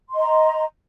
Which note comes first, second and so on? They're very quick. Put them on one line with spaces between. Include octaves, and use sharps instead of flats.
C6 D#5 A#5